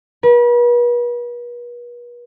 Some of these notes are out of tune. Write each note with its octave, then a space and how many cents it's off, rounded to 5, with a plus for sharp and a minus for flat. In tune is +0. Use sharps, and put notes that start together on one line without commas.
B4 -40